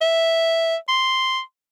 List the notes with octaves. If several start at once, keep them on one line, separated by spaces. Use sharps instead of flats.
E5
C6